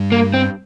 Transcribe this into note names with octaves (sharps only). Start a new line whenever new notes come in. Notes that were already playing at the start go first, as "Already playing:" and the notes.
Already playing: G2 G3
A#3
C4